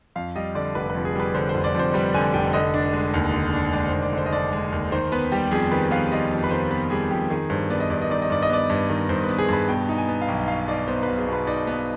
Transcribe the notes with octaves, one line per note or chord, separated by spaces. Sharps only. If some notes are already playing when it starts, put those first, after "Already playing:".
F2 F5
G3 D#5
D3 D5
F1 B4
B4
F2
G#4
G3 B4
D3 C5
C5
F1
D5
F2 C5
G3 B4
D3 G#5
F1 G5
D3 D#5
D4
G#3
D#2
D3
D4
G#3 D5
D#2 C5
D5
D3 C5
D#5
D4 D5
G#3
D#2
D#3 C5
B3 B4
G3 G4
F2 G#4
D#3 B4
B3 F5
G3 D#5
F2
B4
D#3 C5
B3 B4
G3 G#4
F2 G4
D#3 G#4
G2 C5
B3 D5
D#5
G2 D5
D#5
D#3 D5
D#5
G2 D5
D#5
B3 D5
G2
D#3
G2 C5
B3 B4
G#4
G2 B4
B2 G5
D#4
G#5
B3
F5
B1 G5
B2 F5
D#4 D5
B3 C5
B1 B4
G#4
B2
B4
D#4 D5
B3